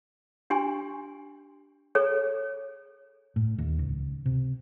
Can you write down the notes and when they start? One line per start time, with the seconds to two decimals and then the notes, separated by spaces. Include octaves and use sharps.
0.50 D4 G4 G#5 C6
1.95 G#4 A4 C#5
3.36 A2
3.58 D#2
3.79 C#2
4.26 C3